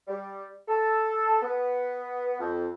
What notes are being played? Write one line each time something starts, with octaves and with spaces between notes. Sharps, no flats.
G3
A4
B3
F2